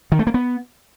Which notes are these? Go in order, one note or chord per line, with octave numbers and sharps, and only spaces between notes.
D#3
A3
A#3
B3